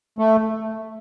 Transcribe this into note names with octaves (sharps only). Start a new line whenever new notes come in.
A3